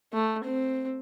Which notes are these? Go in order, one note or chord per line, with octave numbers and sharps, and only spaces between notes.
A3
C4